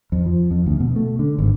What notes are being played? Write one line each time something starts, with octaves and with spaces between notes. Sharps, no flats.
F2
F3
F2
D2
B2
A3
D3
G#1